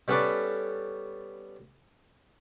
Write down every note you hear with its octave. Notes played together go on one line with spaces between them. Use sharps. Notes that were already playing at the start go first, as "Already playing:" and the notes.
G3 B3 C#4 A4 B4 D5